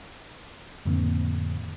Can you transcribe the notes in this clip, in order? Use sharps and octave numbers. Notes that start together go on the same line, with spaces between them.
F2 A2 D3 D#3 A#3 C4